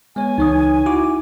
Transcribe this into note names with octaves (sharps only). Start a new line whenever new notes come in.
G#3 B3 C#5 G#5
C#2 E3 D#4 C#5 D#6
E4 F#4 D6